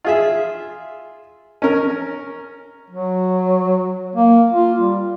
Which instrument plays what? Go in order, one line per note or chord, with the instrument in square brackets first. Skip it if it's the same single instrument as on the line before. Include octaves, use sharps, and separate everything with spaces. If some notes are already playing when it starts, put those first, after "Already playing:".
[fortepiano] F4 G#4 E5
C#4 A#4
[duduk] F#3
A#3
F4
G3